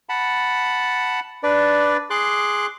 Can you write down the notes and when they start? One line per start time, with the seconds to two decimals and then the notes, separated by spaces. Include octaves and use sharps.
0.09 F#5 A5 B5
1.43 D4 B4 D5
2.10 G#4 C6 D6 F#6